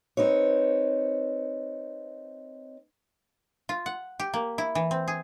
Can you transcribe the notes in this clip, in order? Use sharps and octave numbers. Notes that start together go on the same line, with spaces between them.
C4 D#4 B4 C#5
F4
F#5
G4
A#3
E4
E3
C4
G#4